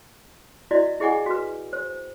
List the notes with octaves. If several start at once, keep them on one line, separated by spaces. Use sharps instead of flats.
E4 F#4 D5 D#5
E4 G#4 D#5 F#5 G#5 D6
F#4 B4
C5